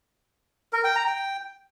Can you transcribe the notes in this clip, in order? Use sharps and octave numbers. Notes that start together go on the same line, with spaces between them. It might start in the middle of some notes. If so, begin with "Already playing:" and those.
A#4
G5
A#5
G5